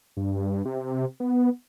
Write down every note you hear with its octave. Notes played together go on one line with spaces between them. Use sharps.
G2
C3
B3